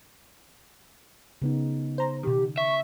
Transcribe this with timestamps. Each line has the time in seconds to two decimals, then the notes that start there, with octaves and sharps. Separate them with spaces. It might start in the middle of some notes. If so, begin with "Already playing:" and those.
1.42 C#3 B3 D#4
1.98 C5 A#5
2.23 B2 D#3 G4
2.58 E5 C#6